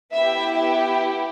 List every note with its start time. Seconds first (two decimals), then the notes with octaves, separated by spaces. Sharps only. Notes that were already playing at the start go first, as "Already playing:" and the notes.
0.15 B3 E4 G4 E5
0.58 E5